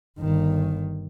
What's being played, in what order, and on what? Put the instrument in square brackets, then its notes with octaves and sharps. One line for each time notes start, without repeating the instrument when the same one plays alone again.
[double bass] G1 D#3